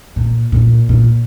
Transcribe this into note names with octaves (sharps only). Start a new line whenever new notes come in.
A#2
A#2
A#2